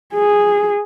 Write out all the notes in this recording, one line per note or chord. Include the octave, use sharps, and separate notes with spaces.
G#4